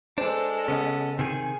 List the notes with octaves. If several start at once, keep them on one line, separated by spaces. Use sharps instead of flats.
G#3 D4 A4 B4 C5
C#3 B3 C#4
C3 D#3 G#4 G#5